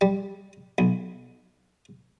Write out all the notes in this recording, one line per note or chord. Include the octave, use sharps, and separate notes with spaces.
G3
B1